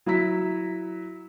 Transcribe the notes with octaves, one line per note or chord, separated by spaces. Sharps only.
F#3 E4 A#5 B6